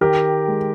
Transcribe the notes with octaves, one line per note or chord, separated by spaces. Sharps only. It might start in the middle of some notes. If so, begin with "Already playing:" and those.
D#3 G4 A#4
G#3